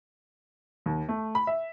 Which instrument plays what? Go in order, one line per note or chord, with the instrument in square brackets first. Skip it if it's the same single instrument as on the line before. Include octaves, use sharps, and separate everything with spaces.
[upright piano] D#2
A3
B5
E5